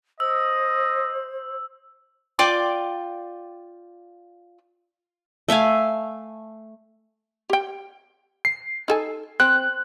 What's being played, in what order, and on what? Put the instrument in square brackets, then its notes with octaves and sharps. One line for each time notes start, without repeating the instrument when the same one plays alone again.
[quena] C5 [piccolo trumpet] D#5 [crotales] E6
[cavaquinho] F4 D5 G5 D6
[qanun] A3 E5 F5 G#5
[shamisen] G4 G5
[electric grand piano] C7
[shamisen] D#4 A4 G#5
[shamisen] C4 [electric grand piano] F#6